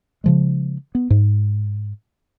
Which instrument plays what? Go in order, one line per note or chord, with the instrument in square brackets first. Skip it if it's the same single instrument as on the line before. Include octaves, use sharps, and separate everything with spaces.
[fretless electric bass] C#3 F3 G#3
B3
G#2